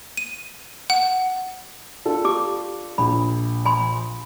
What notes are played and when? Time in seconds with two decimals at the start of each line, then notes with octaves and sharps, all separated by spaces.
0.17 D#7
0.90 F#5
2.05 D4 F4 A4
2.25 G4 D6
2.98 A#1 B5
3.65 G#5 B5 C6